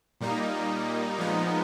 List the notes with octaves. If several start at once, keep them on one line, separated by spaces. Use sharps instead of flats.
A#2 G3 A#3 D#4
A#2 F3 G#3 B3 D#4